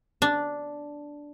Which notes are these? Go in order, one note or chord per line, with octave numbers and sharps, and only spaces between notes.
D4